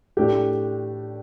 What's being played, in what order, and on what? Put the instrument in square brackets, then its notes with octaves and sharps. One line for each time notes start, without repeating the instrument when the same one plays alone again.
[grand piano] A2 A3 D4 G4